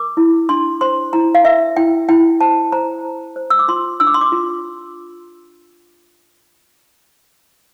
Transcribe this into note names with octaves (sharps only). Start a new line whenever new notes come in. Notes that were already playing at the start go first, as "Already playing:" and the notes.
Already playing: A#4 D6
E4
D4 C6
C5 C6
E4 A#5
F5
A#4 E5
E4 G5
E4 G5
C5 A5
C5 A#5
C5
C5
E6
D6
F4 C6
D4 E6
D6
C6
D6
F4